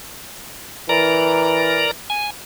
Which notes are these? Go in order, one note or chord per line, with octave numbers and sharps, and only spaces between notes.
E3 A#4 D5 A#5
G#5